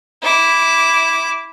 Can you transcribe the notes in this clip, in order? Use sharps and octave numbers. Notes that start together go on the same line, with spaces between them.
E4 D6